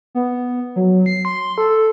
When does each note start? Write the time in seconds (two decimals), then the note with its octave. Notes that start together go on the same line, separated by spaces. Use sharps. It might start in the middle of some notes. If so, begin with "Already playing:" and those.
0.15 B3
0.76 F#3
1.06 C7
1.25 C6
1.58 A4